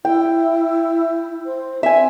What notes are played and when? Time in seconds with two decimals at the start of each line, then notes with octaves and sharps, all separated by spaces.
0.05 E4 G5
1.45 C5
1.83 C4 E5 G#5